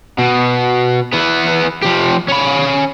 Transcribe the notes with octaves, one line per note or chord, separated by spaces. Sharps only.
B2
E3 B3
F3 G4
C#4 B5